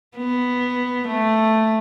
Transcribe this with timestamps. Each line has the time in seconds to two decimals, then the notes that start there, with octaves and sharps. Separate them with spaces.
0.17 B3
1.08 A3